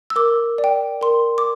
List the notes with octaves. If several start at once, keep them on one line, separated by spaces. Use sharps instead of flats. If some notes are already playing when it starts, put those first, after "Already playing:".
E6
A#4 D6
D5
G5
A#4 C6
D6